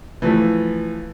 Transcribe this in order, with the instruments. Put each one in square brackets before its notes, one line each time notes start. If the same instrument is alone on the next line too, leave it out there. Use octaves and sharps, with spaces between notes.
[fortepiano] E3 F3 A3